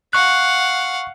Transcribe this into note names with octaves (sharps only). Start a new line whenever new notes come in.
F5 F#5 C#6 F#6